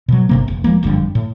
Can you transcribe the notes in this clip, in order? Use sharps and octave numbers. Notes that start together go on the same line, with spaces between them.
B2 F#3
G1 C3 A#3
F1
F3 G#3 A#3
F#1 F2 D3 G3
A2